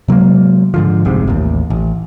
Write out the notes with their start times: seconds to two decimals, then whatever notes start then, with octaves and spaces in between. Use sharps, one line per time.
0.08 C3 F#3 G#3 A#3
0.74 G#2 D3 F3
1.05 F1 C2 G#2 C3
1.27 A1 D#2
1.70 A1